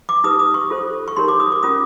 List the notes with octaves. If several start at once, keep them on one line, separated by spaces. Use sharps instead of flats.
D6
D#4 G4 B4 D#6
D#6
C#6
F4 A4 C5
C#6
D#4 G4 A#4 C#5 C6
D6
D#6
D6
C#4 F4 A#4 D#6